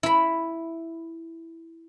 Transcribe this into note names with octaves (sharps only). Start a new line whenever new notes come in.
E4 B5